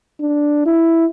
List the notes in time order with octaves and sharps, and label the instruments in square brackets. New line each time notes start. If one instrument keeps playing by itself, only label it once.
[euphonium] D4
E4